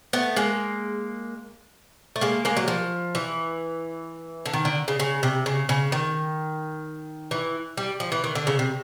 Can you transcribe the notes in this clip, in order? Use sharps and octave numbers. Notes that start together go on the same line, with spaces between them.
A3 B3
G#3 A#3
A3
G#3 A#3
G#3 A#3
F#3
F3
E3
D3
D#3
D3
C#3
C#3
C3
C#3
C#3
D#3
E3
G3
F3
E3
D#3
D3
C#3
C3